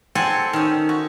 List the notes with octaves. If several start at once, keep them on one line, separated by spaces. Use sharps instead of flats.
C4 G4 A4 F#5 G#5
D#3 C#4
F#4